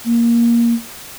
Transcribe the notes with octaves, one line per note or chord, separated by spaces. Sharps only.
A#3